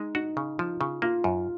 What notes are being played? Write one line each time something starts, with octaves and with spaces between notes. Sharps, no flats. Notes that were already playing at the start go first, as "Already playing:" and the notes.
Already playing: G#3 D#4
D#4 F#4
C#3
F3 F4
C#3
A#3 F4
F#2